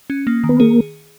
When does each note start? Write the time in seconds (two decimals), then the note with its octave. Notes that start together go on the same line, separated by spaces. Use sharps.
0.10 C#4
0.27 A#3
0.44 D#3
0.49 B3
0.60 A#3 G#4